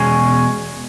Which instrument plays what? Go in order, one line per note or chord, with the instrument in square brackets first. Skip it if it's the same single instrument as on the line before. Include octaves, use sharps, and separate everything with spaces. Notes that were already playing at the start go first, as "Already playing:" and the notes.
Already playing: [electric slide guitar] E2 B2 G#3 C#4